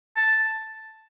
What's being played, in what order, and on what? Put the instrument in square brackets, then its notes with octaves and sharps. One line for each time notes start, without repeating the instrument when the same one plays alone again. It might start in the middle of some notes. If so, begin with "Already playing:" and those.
[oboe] A5